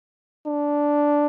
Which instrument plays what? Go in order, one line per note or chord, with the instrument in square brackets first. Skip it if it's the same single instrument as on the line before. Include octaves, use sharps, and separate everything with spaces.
[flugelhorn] D4